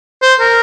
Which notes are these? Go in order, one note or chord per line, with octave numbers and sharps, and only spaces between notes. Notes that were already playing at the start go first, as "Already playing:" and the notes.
C5
A#4